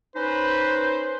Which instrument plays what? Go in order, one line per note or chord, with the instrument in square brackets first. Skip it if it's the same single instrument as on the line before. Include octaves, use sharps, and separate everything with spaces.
[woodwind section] C#4 D#4 C5 [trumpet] B4